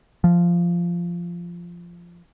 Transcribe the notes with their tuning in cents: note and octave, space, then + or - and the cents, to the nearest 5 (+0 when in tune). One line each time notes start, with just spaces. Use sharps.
F3 -10